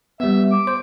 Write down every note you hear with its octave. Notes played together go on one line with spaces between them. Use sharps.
G3 B3 E5
D6
C5